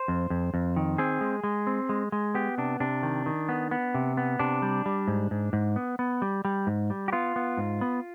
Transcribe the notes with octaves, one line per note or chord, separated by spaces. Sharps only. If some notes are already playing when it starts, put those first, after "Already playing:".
Already playing: C5
F2
F2
F2
D#3
C4 G#4
G#3
G#3
C4
G#3
G#3
B3 G4
C3 D4
C3 D4
D#3
D#3
B3
B3
C3
B3
C3 D4
G3
G3
G#2
G#2
G#2
B3
B3
G3
G3
G#2
G3
G4
B3 F4
B3
G#2
B3